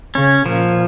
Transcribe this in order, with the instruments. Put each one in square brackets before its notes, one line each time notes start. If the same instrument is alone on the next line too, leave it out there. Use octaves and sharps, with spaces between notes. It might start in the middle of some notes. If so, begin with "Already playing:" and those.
[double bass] C#3 [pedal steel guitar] C#4
[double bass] A#2 [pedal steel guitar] F3